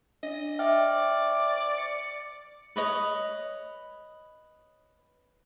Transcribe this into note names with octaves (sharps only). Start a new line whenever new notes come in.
D4 D#5
D5 E5 G5 F6
C#7
B4 C#5 D#5